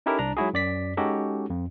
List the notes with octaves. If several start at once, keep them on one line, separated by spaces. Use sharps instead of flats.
C#4 D#4 E4 G4 A4 A#4
C2 D4 A#5
F#3 G#3 D#4 E4 F#4 G#4
F#2 D5 B6
G#3 C#4 D#4 F#4 G4 A4
F2